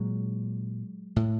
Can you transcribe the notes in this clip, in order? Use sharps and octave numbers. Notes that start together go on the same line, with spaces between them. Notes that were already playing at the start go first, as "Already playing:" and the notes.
Already playing: A#2 F#3 G#3
A2